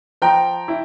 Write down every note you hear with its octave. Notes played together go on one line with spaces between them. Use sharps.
F3 G5 A#5
E4